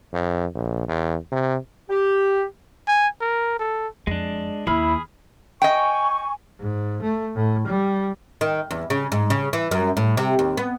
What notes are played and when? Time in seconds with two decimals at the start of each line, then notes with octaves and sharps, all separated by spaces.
0.13 F2
0.54 A#1
0.88 E2
1.31 C3
1.89 G4
2.88 G#5
3.21 A#4
3.60 A4
4.07 F2 G#3 D4
4.67 D#2 E4 G#4 B5 F6
5.62 D#5 G5 G#5 C#6
6.60 G#2
7.02 A3
7.36 A2
7.67 G3
8.41 D#3
8.71 E2
8.90 C#3
9.12 G#2
9.30 C#3
9.53 E3
9.71 F#2
9.97 A2
10.17 C3
10.39 D#2
10.57 B3